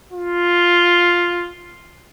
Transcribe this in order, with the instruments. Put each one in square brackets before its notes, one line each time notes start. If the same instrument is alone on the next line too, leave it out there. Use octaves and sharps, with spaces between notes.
[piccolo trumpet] F4